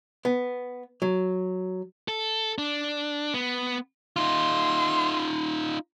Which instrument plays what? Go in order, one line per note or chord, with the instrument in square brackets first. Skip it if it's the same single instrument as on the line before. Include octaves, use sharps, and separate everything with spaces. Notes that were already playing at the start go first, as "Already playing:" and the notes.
[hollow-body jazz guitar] B3
F#3
[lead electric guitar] A4
D4
B3
[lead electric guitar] D#4 F4 [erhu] C6